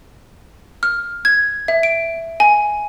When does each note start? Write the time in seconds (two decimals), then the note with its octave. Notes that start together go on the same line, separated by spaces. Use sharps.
0.83 F6
1.25 G#6
1.68 E5
1.83 D7
2.40 G#5